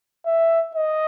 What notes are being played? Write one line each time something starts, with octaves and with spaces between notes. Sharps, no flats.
E5
D#5